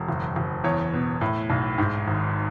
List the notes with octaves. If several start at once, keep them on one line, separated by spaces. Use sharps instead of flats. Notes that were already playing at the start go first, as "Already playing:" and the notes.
Already playing: E1
F#1
F#1
E2 C#5
B2
A2
B1
G#2
G#1